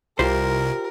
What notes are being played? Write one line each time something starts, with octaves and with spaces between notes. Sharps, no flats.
C2 F4 G4 A#4 C5